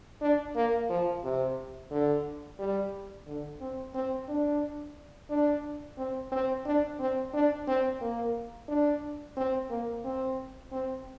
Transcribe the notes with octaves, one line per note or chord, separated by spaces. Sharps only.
D4
A#3
F3
C3
D3
G3
D3
C4
C4
D4
D4
C4
C4
D4
C4
D4
C4
A#3
D4
C4
A#3
C4
C4